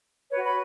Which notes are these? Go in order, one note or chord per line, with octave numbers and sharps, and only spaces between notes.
F#4 B4 C#5
B5